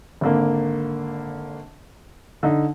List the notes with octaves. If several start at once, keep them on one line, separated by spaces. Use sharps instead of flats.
G#1 D3 A#3
D3 D#4